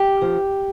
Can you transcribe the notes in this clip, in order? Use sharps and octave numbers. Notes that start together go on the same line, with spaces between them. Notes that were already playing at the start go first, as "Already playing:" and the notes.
Already playing: G4
F3